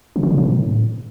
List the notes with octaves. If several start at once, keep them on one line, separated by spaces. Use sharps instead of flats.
C#3
D3
C3
C#3
A2